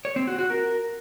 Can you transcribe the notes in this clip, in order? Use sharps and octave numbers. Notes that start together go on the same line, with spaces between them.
C#5
C4
F#4
F#4
A#4